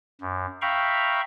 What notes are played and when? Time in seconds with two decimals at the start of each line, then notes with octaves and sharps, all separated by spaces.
0.21 F#2
0.62 E5 F5 G5 A#5 B5 C#6